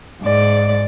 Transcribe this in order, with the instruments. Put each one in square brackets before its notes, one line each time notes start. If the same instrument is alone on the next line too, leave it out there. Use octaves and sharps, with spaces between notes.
[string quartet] G#2 D5